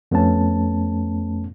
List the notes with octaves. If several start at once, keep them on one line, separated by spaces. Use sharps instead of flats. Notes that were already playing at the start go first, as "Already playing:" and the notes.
F2 A3 B3 C#4 A5